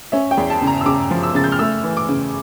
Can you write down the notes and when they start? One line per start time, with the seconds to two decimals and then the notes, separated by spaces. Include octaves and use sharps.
0.12 C#4 E5
0.31 G5
0.37 E2
0.50 A5
0.62 C#3
0.67 A#5
0.81 E6
0.86 C#3 D6
1.11 F3
1.23 E6
1.35 C#3 A6
1.44 G6
1.52 F6
1.59 A3 E6
1.84 E3
1.97 D6
2.08 C#3